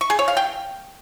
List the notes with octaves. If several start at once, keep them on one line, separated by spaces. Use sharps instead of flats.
C#6
G#4
C#5
F5
G5